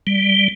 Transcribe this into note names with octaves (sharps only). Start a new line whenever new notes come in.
G3